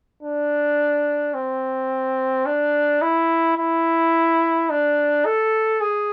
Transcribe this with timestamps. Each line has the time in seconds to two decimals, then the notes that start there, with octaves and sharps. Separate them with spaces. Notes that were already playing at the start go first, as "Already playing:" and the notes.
0.23 D4
1.34 C4
2.46 D4
3.02 E4
3.57 E4
4.70 D4
5.26 A4
5.81 G#4